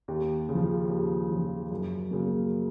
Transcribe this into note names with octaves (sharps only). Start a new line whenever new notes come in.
D#2
C#3
F3
D#2
C#3 F3
F#2
C#3 F#3 A#3